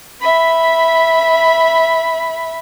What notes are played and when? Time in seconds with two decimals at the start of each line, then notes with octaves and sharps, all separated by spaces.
0.21 E5 B5